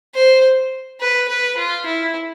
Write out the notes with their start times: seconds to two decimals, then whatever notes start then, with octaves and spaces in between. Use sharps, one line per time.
0.15 C5
1.00 B4
1.28 B4
1.57 F4
1.86 E4